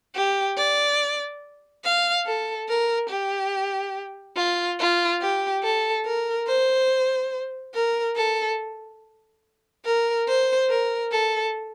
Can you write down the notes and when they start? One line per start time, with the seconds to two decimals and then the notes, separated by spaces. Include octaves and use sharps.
0.15 G4
0.57 D5
1.84 F5
2.26 A4
2.69 A#4
3.10 G4
4.36 F4
4.79 F4
5.21 G4
5.63 A4
6.05 A#4
6.48 C5
7.74 A#4
8.16 A4
9.85 A#4
10.27 C5
10.69 A#4
11.11 A4